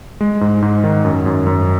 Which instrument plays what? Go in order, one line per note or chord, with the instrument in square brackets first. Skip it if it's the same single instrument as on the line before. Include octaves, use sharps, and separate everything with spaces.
[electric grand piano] G#3
G#2
G#2
D#3
F#2
F#2
F#2